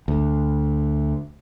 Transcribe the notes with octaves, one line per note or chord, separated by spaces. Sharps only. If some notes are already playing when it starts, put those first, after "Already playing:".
D2